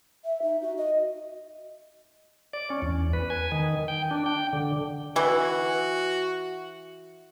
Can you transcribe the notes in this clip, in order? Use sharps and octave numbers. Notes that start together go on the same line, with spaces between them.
E5
D#4
F#4
D#5
D5
C#4
E2
B4
G#5
D#3
G5
D4
G5
D3
E3 F#4